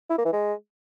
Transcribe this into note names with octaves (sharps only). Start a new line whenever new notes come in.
E4
A#3
E3
G#3